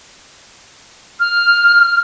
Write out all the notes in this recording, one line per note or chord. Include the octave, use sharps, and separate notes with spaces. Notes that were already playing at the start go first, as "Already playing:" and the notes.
F6